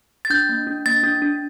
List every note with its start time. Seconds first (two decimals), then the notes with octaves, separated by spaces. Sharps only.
0.25 A6
0.30 D4 G6
0.49 A#3
0.67 D4
0.86 A#3 A6
1.04 D4
1.22 D4